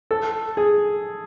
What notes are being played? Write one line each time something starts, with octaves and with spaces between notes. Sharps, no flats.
A4
G#4